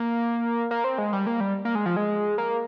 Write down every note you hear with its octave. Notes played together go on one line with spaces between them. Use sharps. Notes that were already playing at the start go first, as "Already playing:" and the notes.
Already playing: A#3
A#3
C4
G#3
G3
A#3
G3
A#3
G#3
F3
G#3
A#3